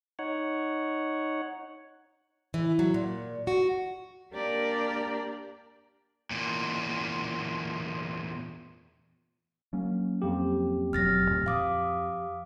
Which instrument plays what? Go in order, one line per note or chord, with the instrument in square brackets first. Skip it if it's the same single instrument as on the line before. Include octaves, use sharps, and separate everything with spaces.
[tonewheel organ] D#4 C#5 F#5
[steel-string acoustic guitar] E3
F#3
A#2
F#4
[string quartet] A#3 D4 G4 A#4 D5 A#5
[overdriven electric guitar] E2 A#2
[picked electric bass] F#3 A#3 C#4
[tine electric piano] F2 G4
[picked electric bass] E1 F#3 [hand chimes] F6 A6 A#6
[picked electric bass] D2 A#2
[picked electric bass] F3 [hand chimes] F5 D6 D#6